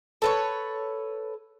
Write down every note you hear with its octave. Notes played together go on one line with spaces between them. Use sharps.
A4 B4 C#5